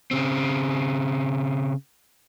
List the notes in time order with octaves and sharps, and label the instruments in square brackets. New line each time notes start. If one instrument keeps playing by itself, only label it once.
[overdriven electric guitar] C#3 C4